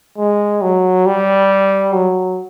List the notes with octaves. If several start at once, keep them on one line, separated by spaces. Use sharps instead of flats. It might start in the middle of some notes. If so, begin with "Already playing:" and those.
G#3
F#3
G3
F#3